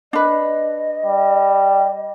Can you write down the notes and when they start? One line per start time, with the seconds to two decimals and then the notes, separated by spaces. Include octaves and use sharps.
0.13 D4 B4 D#5
1.06 G3